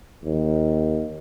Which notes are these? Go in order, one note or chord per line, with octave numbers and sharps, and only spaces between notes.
D#2